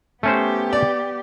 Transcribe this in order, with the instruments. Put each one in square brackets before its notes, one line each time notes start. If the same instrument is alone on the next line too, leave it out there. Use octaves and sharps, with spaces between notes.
[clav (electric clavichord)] A3 C#4 C5 [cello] B3 G4
[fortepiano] D5